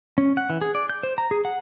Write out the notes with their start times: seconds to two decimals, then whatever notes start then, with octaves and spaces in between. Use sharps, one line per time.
0.18 C#4
0.37 F#5
0.50 E3
0.61 G#4
0.75 D5
0.89 G6
1.03 C5
1.18 A#5
1.31 G#4
1.45 F#5